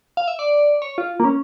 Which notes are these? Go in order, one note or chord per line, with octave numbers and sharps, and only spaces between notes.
F5
E5
D5
C#5
F4
A#3
C#4